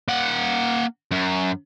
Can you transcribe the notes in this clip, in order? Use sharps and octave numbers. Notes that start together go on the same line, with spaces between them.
A#3 F#5
F#2